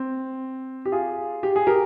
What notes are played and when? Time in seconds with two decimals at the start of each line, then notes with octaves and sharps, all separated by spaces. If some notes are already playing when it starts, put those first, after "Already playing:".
Already playing: C4
0.85 G4
0.92 F4 G#4
1.43 G4
1.56 G#4
1.67 G4 A#4